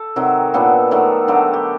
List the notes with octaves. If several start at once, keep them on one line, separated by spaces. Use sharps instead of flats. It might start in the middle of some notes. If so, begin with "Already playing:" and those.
Already playing: A4
C3 D#3 F#3
A#2 F#3 B3 D4 A4
D#3 F#3 A3
D3 F#3 A3 D4 G4
G4